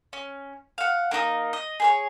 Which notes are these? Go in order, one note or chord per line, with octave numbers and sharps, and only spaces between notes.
C#4
F5 F#5
A#3 D#4 A4 D#5
D#5
G#4 B4 C#5